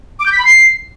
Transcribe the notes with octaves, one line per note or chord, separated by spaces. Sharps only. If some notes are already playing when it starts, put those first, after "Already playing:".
D6
G6
B6
B5
C7